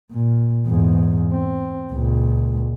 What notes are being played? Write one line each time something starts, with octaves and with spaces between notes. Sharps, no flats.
A#2
E2 G#2
C4
C#2 A#2